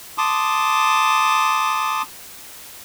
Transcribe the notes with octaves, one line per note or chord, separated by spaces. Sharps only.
A5 C6 D6 D#6